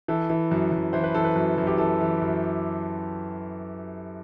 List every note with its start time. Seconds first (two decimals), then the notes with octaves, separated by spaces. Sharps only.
0.08 E3 A4
0.30 E3
0.51 F#2
0.72 F#2
0.93 E3 C5
1.04 B4
1.15 E3 A4
1.24 B4
1.36 F#2
1.58 F#2
1.67 G4
1.78 E3 A4
2.01 E3
2.22 F#2